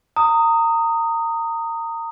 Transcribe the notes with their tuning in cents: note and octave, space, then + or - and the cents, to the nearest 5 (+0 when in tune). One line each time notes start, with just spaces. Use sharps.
A#5 -25 D#6 +0